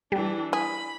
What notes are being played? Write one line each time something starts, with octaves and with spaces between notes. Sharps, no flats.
E3 G3 D4
G#4 B5